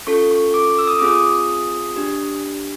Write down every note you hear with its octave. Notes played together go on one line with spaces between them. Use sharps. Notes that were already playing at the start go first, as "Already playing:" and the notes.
C#4 F4 A4 C#6
C#6
D6
E6
D#6
C4 F4 G#4 D6
D#6
D4 G4